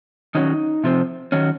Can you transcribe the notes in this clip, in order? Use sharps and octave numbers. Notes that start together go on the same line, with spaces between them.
D#3 F#3 C#4 D#4
C3 F3 C4
D#3 F#3 C#4